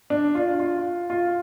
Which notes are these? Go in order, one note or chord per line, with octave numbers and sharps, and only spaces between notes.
D4
F4
F4
F4